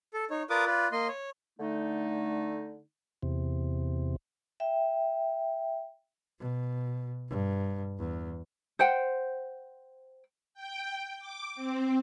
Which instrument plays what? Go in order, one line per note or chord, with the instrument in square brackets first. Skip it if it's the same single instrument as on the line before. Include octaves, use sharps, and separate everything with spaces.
[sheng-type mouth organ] A4
D#4 C#5
F4 A#4 B4 D5 D6 D#6
F4 B4 D5
A#3 D#5 C6
C#5
[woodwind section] D3 A3 D#4
[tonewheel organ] E2 C3
[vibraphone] E5 G5
[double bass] B2
G2
E2
[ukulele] C5 F#5 G5
[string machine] G5
D6
C4